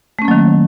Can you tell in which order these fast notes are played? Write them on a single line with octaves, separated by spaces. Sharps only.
A3 C#4 A#3 F#3 D#3